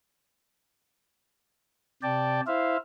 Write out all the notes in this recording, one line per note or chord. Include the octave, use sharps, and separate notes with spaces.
C3 D5 G5 A5
E4 C5 E5 F5